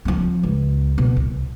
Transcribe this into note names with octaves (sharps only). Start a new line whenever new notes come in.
F3 C4
C#2
B2
C2